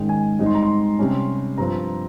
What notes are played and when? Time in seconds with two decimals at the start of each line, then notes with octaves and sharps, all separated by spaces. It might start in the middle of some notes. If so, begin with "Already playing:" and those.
Already playing: G#2 D#3 G#3 C#4 G5
0.09 G#5
0.39 G#2 G3 C4 D#4
0.46 C6
0.54 A#5
0.63 C6
0.99 C3 G3 C#4
1.58 G2 F3 C4 A#5